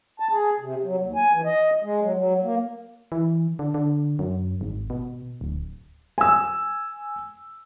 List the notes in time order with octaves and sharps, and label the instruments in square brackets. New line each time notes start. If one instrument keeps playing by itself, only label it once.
[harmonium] A5
G#4
C3
F#3
D#2
G#5
E3
D#5
G#3
F#3
F#3
A#3
[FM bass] E3
D3
D3
F#2
G#1
B2
D1
[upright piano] G#5 E6